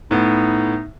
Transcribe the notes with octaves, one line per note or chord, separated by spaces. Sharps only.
A2 B3 D#4